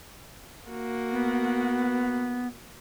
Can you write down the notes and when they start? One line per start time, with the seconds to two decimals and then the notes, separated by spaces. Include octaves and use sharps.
0.69 A#3 F#4
1.12 B3